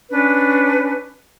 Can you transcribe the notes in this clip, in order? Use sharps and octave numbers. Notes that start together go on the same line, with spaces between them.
C#4 D4 B4